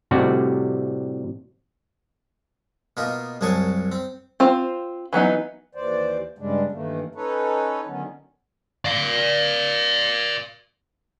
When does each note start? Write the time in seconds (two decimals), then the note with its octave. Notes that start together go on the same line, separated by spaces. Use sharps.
0.11 A2 C3 G3 F#4 D5
2.97 B2 A#3 D#4 F4
3.41 C2 F#2 F#3 G#4 A5 C#6
3.92 C4
4.40 C4 F4 C5
5.13 E3 F#3 B3 D#4
5.75 D#2 E3 C5 D5
6.39 G2 C#3 G3 G#3 D4
6.72 G2 D#3 E3 A3 A#3
7.15 C#4 D#4 A4 B4 C#5
7.87 D3 D#3 F#3 B3 C#4
8.85 D5 F5